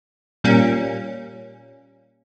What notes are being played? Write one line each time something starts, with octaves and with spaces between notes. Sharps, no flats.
A#2 G3 A#3 C#4